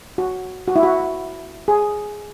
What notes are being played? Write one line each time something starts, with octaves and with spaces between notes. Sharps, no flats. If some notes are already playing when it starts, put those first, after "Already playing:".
F#4
F#4
E4
F#4
G#4